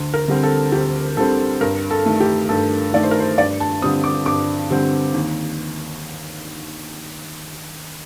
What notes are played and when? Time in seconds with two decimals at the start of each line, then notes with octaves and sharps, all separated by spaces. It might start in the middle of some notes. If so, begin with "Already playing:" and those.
Already playing: D2
0.14 A#4
0.28 D3 G3 C4
0.43 A4
0.72 D2 G4
1.17 D3 G3 C4 A4
1.61 G2 A#4
1.91 A4
2.06 D#3 A3
2.20 G4
2.49 G2 A4
2.93 D#3 A3 D5
3.03 C5
3.11 A#4
3.20 C5
3.38 G2 D5
3.60 A5
3.82 D3 G3 C4 D#6
4.04 D6
4.26 G2 D6
4.71 D3 G3 C4
5.14 D#2